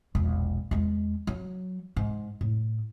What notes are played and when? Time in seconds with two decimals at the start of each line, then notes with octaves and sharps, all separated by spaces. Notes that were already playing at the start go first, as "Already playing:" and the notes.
0.15 E1 A#1
0.71 E2 G#3
1.27 F#3
1.96 G#2
2.41 A2